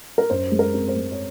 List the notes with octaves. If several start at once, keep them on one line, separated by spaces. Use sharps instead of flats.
A#4
F#2 C5
G#3
A#4
C4
C5
G#3
C#5